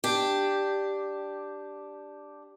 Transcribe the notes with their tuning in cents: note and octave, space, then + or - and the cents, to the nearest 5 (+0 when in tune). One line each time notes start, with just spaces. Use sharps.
D4 +0 G4 +0